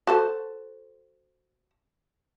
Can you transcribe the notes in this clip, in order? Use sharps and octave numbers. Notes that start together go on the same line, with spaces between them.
F#4 A4 C5